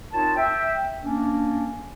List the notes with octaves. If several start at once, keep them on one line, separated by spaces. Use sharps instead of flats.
C4 D#4 F4 A#4 C#5 A5
E5 G5
A#3 C#4 D4